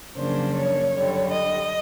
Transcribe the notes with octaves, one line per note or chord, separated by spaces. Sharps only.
F#2 C#3 F3 A#3 D4 C5
C#5
F#2 D3 G3
D#5